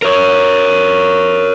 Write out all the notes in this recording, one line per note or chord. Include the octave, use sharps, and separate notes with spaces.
A#4 C#5